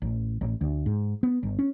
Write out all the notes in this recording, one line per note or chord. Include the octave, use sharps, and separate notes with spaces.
A1
A1
D2
G#2
B3
G1
C#4